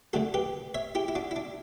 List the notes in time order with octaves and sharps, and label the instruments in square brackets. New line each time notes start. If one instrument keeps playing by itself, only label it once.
[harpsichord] F#2 D3 A3 F#4 A4
G4 B4
C#5 E5
E4 G4
E4
D4 F#4
E4
D4